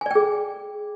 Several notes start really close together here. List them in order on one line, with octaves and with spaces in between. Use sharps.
G#5 D5 G5 G#4